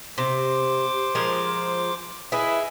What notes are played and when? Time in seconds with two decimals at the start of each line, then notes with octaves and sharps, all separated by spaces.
0.18 C3 C5 D6
1.15 F3 G#3 A#4
2.32 E4 G#4 B4 D#5 E5